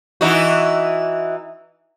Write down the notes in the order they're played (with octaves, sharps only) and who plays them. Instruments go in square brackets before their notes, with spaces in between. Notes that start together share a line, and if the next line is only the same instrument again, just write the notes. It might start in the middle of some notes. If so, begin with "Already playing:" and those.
[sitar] E3 D#4 F#4